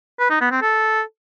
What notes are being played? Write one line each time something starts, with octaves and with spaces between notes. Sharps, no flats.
B4
D#4
B3
C4
A4